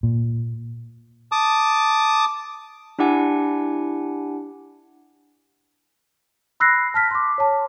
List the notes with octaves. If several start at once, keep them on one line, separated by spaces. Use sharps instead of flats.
A#2
A5 D6 D#6
D4 E4 G4 F#5 G#5
B5 E6 F#6 A#6 C7
A5 F6 B6
C6 D6
C#5 A5